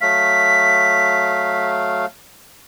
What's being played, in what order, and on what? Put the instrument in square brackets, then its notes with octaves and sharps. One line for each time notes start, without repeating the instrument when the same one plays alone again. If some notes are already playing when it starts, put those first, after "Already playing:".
[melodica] F#3 A3 F5 [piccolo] B6